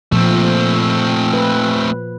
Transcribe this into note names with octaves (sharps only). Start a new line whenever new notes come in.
A#2 F3 A3 C4
B4